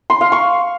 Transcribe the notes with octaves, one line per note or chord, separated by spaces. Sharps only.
C6
F5
C#6